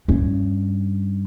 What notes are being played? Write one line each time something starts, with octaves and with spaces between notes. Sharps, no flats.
G2 C#4